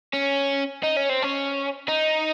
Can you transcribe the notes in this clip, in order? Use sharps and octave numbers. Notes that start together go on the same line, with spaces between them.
C#4
D#4
C#4
C4
C#4
D#4